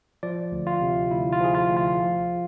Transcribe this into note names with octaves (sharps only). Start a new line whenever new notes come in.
F3 D5
D2
F4
C3
D2 E4
F4
F3 G#4
F4
D2
F4
F3